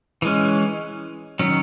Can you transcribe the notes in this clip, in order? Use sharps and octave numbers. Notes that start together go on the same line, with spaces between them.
E3 G#3 C#4
D#3 F#3 C#4